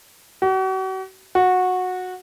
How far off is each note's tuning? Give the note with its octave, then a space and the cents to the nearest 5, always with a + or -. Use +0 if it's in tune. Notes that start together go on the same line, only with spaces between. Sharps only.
F#4 +40
F#4 -15